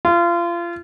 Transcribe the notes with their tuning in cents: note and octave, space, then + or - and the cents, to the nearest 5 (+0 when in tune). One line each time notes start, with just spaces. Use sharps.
F4 -30